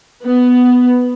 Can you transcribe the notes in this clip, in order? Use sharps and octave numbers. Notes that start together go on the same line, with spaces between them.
B3